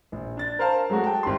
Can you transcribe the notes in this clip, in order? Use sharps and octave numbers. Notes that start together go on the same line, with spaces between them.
A#1
D4 A6
A#4 C5 F5 A5
F#3 G#3 A3 F#4
G5 A5
G#1 G3 C6